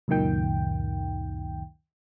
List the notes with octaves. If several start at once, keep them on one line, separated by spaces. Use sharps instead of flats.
C#2 F#2 A#2 D#3 G5